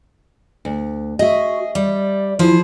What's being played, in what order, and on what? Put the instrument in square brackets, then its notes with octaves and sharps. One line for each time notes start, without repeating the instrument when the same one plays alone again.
[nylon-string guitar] D2
[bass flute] F#4 [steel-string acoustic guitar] G#4 [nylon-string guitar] D#5 E5
[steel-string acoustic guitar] G3 [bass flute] D5
[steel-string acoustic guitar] F3 G#4 C5 [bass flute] E4